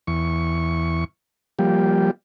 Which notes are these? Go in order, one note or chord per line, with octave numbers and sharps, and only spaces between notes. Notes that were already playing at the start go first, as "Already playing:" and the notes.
E2 C#6
F3 G3 A#3 G4